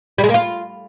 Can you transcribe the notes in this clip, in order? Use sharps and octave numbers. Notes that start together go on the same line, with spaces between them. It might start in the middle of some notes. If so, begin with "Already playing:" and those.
G3
G#3
A#3
F4